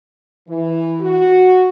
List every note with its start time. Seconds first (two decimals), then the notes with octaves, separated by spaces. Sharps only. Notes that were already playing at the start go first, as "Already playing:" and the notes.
0.48 E3
1.00 F#4